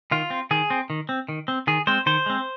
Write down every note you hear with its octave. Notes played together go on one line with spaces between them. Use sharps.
D#3 F4
C4
D#3 G#4
C4
D#3
C4
D#3
C4
D#3 G#4
G#3 C4 C5
D#3 C5
G#3 C4